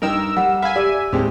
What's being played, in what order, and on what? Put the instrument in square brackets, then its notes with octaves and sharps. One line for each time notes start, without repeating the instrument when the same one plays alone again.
[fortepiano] G2 D#4 G5 [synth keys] A#4 E6
[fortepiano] G3 [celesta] F#5
[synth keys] E5 G#5 [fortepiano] F5 B5
[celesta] G4 E6 [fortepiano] D5
[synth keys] D#2 A2 [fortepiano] G#3 C4 G4